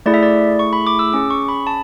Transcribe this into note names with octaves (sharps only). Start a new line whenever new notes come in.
A3 E4 G#4 D5
E5
D5
C#6
B5
D6
E6
C#4 G#4 D6
C#6
B5
A5